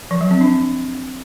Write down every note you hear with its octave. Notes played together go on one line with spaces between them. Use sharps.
F3
F#3
C4
D4